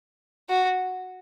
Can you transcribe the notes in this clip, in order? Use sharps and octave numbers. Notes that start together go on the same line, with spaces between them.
F#4